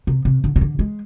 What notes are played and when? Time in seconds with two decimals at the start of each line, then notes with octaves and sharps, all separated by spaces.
0.07 C3
0.25 C3
0.44 D3
0.56 C3
0.61 D3
0.79 G#3